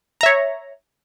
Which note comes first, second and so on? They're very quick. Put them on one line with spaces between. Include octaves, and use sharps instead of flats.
A#5 E5 C#5